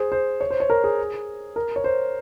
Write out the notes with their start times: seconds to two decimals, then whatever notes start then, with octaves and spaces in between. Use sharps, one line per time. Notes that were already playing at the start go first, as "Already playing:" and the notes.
Already playing: G#4 C5
0.12 C5
0.41 C#5
0.50 C5
0.60 C#5
0.70 A#4
0.84 G#4
1.56 A#4
1.76 C#5
1.84 C5